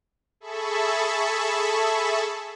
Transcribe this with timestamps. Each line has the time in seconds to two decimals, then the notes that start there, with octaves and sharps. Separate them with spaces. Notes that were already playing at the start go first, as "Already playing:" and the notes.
0.40 G#4 A4 E5 A5 B5 C#6